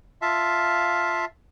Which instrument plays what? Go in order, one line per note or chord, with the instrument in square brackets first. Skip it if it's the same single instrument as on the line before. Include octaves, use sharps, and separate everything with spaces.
[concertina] F4 E5 F5 A5